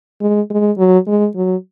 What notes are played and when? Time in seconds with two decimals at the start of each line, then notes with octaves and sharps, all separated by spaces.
0.21 G#3
0.50 G#3
0.78 F#3
1.07 G#3
1.36 F#3